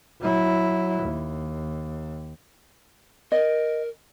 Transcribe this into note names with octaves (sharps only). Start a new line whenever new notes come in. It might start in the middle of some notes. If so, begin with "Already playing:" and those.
F#3 E4
D#2
A#4 D#5